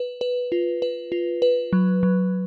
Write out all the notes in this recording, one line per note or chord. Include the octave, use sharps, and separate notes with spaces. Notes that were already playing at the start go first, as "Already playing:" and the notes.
Already playing: B4
B4
F4
B4
F4
B4
F#3
F#3